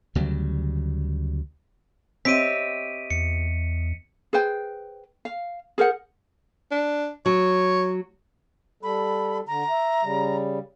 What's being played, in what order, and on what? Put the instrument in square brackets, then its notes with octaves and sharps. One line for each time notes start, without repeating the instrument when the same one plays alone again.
[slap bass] D2 C#3 F#3 G3
[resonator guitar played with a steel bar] C4 G4 [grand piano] C#5 D#5 E5 [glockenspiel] B6 D7 D#7
[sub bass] E2 [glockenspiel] C#7
[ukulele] G#4 B4 C5 G5
F5
G#4 A#4 C5 F#5
[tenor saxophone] D4
[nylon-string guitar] F#3 [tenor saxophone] C#5
[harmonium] G3 A4 [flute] B5
[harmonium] D3 [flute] A#5
[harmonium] E5
C#3 G3